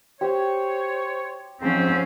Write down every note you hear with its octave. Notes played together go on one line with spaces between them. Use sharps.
G4 C5 C#5
G#2 F3 C4 C#4